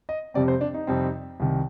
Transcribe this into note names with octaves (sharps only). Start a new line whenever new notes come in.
D#5
F2 C3 G3 C4 D5
C5
D4
D#4
F2 C3 G3 C4
C2 C3 D#3